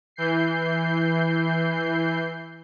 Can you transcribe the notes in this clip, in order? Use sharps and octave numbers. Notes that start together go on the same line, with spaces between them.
E3 G6 C7